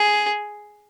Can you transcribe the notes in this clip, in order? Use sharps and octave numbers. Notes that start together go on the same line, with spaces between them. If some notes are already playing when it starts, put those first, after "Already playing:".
Already playing: G#4